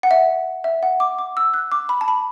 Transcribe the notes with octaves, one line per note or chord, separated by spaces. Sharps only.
F#5
E5
E5
F#5
D6
D6
E6
F#6
D6
B5
A5
B5